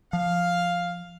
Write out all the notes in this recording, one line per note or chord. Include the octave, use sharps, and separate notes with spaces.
F3 F5